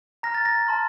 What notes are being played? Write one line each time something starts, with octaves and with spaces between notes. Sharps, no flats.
A#5 F6 A#6
A6
A#6
A5 C6 F6